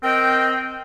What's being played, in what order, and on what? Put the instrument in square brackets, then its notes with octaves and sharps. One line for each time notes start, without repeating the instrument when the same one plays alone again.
[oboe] C4 [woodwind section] A#4 D#5 G5